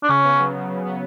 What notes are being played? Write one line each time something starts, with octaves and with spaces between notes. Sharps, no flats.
D4
C#3 C#4
B3
F#3
C#3
C#3
B3